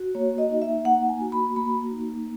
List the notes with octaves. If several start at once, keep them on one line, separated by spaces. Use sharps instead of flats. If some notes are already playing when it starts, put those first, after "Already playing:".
Already playing: F#4
A#3 C#5
D#5
D#4
E5
A#3 F#5
G#5
F#4
B5
A#3 B5
D#4